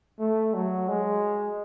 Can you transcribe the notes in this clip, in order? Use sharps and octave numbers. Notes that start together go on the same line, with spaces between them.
A3
F#3
G#3